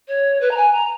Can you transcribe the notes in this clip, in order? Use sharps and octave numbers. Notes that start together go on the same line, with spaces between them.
C#5
B4
A#5
G#5
A#5